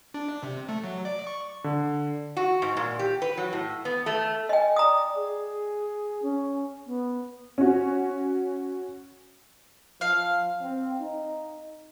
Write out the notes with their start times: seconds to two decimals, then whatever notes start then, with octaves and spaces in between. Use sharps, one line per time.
0.14 D4
0.43 C3
0.69 A3
0.84 F#3
1.05 D5
1.27 C#6
1.64 D3
2.37 F#4
2.62 G#2
2.77 A#2
2.99 G4
3.22 B4
3.37 F#3
3.53 A2
3.85 B3
4.06 A3
4.49 D#5 G5 G#5
4.76 D5 A#5 D#6
5.15 G#4
6.22 C#4
6.86 B3
7.58 C#4 F#4
10.01 F3 F5
10.62 C4
11.01 D#4